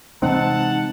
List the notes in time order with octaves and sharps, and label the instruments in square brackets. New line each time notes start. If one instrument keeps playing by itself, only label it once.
[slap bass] C3 E3 G#3 [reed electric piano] C4 [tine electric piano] D#4 [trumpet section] F#5 A5